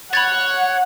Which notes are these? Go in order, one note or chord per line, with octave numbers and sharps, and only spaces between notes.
C#5 F#5 B5 G#6 A6